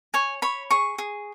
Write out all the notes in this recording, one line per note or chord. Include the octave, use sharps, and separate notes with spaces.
C#5 G#5
C#5 B5
G#4 C#6
G#4